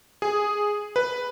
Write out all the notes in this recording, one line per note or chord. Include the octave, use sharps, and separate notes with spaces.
G#4
B4